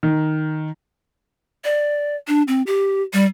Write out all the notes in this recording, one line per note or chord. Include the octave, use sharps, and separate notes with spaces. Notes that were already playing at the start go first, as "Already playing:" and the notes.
D#3
D5
D4
C4
G4
G3